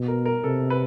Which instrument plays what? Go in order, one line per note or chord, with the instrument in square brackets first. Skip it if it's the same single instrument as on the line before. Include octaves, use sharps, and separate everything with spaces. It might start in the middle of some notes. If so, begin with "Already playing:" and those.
Already playing: [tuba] B2
[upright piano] A#4
A#4
[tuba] C3 [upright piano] A4
[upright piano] B4